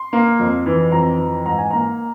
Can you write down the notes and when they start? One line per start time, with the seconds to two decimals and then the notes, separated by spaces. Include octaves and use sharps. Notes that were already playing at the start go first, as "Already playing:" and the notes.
Already playing: C6
0.13 A#3
0.39 F2
0.66 E3
0.92 F2 A#5
1.19 E3
1.46 G#2 A#5
1.58 G#5
1.71 A#3 A#5